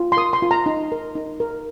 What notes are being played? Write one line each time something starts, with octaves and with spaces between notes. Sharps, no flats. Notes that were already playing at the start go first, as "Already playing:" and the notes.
Already playing: F4
C6
A#4 D#6
C6
F4
A#5
D#4
A#4
D#4
A#4